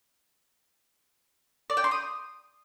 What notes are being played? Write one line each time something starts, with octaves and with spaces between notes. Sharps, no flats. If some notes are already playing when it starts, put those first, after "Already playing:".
D5
G5
C6
D#6